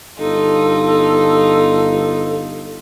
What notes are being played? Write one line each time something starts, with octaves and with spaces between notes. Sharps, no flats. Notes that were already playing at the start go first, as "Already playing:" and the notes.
G1 D#4 F4 A4